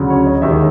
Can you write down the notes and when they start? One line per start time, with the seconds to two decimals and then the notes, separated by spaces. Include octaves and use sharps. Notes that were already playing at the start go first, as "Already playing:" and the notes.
Already playing: D2 C#3 F#3
0.10 C#5
0.26 D#5
0.42 D#2 D#3 G#3 E5